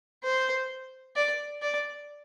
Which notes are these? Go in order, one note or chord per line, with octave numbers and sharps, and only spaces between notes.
C5
D5
D5